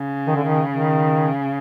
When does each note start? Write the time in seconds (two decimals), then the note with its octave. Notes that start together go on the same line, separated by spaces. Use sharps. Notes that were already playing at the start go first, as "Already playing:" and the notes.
Already playing: C#3
0.27 D#3
0.36 D3
0.44 D#3
0.70 D#3